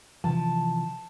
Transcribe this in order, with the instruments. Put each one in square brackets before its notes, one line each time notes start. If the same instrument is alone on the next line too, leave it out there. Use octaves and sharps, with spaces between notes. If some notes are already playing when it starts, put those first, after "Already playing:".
[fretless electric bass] C3 E3 F3 [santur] A5